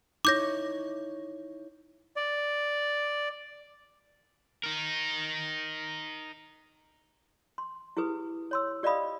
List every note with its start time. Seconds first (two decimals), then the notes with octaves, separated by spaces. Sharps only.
0.25 D#4 E4 C#5 D6 G6 A#6
2.16 D5
4.64 D#4 A#4
7.58 C6
7.97 E4 G4 G#4 B4 D#6
8.51 C#5 C6 E6
8.83 G4 D5 D#5 F5 B5 D#6